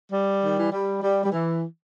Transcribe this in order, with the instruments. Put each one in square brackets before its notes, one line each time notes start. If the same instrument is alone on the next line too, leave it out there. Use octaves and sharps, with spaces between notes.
[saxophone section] G3
D#3
E3
G3
G3
G3
E3